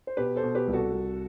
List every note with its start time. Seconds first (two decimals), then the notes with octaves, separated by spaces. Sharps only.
0.07 C5
0.17 B2 G4 B4
0.36 A4 C5
0.43 B2
0.55 G4 B4
0.67 C2
0.73 F#4 A4
0.92 C2